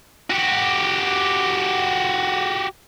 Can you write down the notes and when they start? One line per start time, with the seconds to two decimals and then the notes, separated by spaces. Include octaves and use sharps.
0.30 F#4 G4